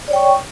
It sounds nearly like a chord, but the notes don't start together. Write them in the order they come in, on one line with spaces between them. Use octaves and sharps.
D5 C#5 G5 C#6